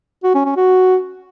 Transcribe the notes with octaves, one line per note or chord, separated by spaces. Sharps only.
F#4
C#4
C#4
F#4